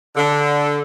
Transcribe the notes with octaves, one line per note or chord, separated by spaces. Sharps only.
D3